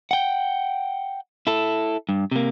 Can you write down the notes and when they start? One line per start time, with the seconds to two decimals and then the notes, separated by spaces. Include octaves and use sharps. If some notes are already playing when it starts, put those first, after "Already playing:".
0.11 F#5 G5
1.47 E4 A4
2.09 G2
2.31 C3 A#3